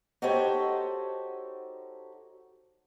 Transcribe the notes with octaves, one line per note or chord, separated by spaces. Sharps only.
D#4 F#4 G4 A4 C5 C#5